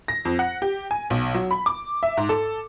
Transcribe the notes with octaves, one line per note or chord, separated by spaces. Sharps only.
A#6
F2
F#5
G4
G#5
B1
F#3
B5
D6
E5
G#2
A4